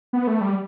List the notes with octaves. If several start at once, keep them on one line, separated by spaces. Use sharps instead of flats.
B3
A3
G3